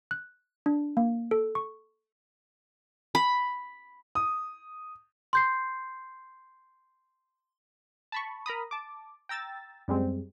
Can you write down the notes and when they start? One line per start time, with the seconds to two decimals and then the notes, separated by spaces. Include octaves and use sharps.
0.11 F#6
0.66 D4
0.97 A#3
1.31 A4
1.55 C#6
3.15 B5
4.15 D#6
5.33 C6 G6 C7
8.12 A5 B5 C#6
8.46 A#4 A#5 B5 D#6
8.71 A5 D6
9.29 G5 A#5 E6 A6
9.88 F#2 G3 G#3 C4